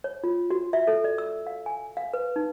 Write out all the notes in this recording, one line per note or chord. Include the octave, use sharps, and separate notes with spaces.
C#5
F4
F#4
E5
A4
D5
E6
F5
G#5
F5
B4
D#4